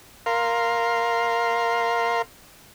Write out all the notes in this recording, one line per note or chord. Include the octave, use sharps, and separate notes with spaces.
A#4 F5 C6